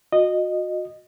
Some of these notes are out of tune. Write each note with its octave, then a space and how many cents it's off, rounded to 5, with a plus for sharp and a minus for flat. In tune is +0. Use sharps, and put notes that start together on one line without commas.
F#4 -30 D#5 -15